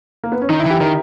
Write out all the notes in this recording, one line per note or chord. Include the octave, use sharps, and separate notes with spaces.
A#3
B3
C#4
D#3 D#4
E4
E3 G4
D#3 A#4